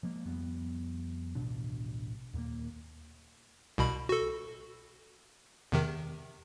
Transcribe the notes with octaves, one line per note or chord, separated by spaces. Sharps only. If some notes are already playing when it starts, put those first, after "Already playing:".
F3 G#3 A#3
F2 F3 G3 B3
A1 D2 B2 D4
D#2 A#2 G3 A#3
C2 B2 B5
F#4 A4
E2 C3 D#3